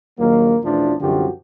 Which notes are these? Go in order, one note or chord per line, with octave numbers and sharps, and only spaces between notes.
A#1 D#2 F#3 A#3
A1 E2 B2 F3 A3 D4
C2 F#2 D3 F3 F#4 G4